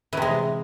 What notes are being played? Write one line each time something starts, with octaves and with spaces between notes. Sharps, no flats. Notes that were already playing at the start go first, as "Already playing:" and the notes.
C3 E3 G#3